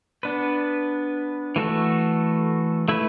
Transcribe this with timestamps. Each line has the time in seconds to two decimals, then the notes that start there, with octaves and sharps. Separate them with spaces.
0.23 B3 D4 B4
1.56 E3 A3 F#4 A4
2.88 A3 E4 B4